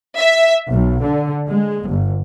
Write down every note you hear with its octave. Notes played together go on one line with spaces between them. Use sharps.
E5
B1
D3
G#3
G1